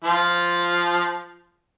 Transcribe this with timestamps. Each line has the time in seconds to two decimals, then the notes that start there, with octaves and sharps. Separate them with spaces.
0.04 F3 F4